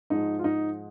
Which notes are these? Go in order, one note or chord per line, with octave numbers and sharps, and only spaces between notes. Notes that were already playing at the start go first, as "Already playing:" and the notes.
G#2 F3 G#3 D#4
F4
D#4